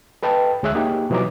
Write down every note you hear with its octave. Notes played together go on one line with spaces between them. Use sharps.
A4 B4 D#5 G5 A5
D2 G#3 G#4 C#5 E5 F#6
A#3 D#4 G4 G#4
B2 E3 F#3 D#5 A#5 D6